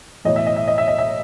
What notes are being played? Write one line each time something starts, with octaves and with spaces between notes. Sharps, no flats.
B1 A2 E3 D#5
E5
D#5
E5
D#5
E5
D#5
E5